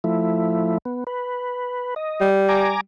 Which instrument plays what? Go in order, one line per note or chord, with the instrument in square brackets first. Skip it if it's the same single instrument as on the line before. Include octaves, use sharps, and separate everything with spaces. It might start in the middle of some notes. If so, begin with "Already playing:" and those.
[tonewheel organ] F3 A3 E4
B3
B4
D#5
[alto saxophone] G3
[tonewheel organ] G#5 A#5 D6